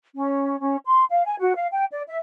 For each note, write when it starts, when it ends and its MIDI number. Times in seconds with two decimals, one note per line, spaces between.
0.15 0.60 61
0.61 0.77 61
0.85 1.04 84
1.10 1.23 77
1.26 1.35 80
1.40 1.55 66
1.55 1.67 77
1.73 1.85 79
1.91 2.01 74
2.07 2.18 76